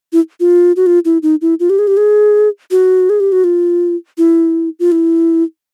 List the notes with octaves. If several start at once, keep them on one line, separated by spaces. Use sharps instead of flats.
E4
F4
F#4
F4
E4
D#4
E4
F4
G4
G#4
G4
G#4
F#4
G#4
G4
F#4
F4
E4
F4
E4